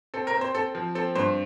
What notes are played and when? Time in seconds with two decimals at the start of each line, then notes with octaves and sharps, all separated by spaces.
0.14 C4 A4
0.27 A#4
0.34 C4
0.41 C5
0.55 C4 A4
0.75 F3
0.95 C4 A4
1.15 G2 C5